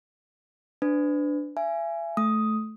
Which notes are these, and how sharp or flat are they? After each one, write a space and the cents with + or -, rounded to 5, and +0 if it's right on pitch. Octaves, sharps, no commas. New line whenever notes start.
D4 +0 B4 +35
E5 +35 G#5 +0
A3 -15 D#6 +5